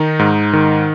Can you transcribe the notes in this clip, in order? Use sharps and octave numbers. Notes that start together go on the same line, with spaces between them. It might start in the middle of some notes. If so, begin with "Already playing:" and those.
Already playing: D#3 D#4
G#2
D#3